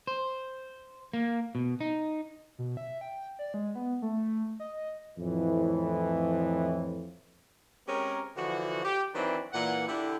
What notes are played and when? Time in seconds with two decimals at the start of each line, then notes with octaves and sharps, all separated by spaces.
0.07 C5
1.13 A#3
1.55 B2
1.81 D#4
2.58 B2
2.77 E5
3.01 G5
3.39 D5
3.54 G#3
3.75 B3
4.02 A3
4.60 D#5
5.18 F2 A2 E3
7.87 G#3 C4 C#4 G4 A#4
8.36 D3 E3 F3 F#4
8.84 G4
9.14 D#3 E3 F#3 C4 D4 B4
9.53 A#2 E3 F#5
9.88 D3 E4 G4